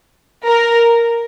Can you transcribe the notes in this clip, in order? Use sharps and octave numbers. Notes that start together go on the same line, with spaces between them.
A#4